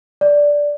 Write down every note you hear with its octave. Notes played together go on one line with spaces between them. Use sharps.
D5